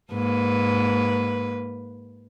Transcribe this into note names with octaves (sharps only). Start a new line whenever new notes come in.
G#2 A#3 B4